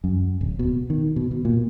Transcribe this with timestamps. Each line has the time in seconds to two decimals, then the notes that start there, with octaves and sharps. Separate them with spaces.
0.04 F#2
0.41 D1
0.59 B2
0.90 D#3
1.16 B2
1.31 B2
1.45 A#2